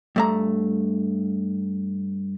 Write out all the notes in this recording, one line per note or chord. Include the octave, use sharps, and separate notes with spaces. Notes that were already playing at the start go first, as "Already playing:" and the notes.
G2 A3 A#5